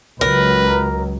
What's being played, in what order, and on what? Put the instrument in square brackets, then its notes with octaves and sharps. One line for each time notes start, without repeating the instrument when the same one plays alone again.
[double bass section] C#2 F#3 [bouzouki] A#4 [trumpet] B4